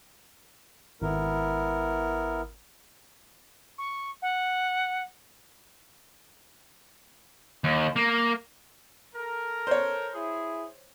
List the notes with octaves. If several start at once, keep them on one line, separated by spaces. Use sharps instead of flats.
G#1 B3 E4 A#4
C#6
F#5
D#2
A#3
A4 A#4
C5 C#5
E4 G#4